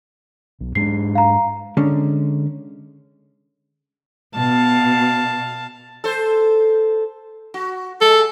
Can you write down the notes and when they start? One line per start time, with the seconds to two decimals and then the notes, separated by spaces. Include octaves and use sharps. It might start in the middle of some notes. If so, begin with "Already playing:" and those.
0.61 B1
0.75 G#2 G#3 D4 C7
1.15 F5 A#5
1.77 D3 G#3 C#4
4.35 B2 F5 A5
6.04 A4 C5
7.54 F#4
8.01 G#3 A4